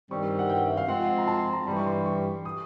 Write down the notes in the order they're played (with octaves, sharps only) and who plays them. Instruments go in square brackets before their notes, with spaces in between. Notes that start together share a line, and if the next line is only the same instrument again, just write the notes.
[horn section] G2 D#3 G3 C4 [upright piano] C#6
[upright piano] F#5
G5
E5
F5
[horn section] F3 G#3 C4 F4 [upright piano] F#5
[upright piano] A#5
A5
A#5
[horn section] G2 E3 G3 [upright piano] B5
[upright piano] C#6
C6
C#6
D#6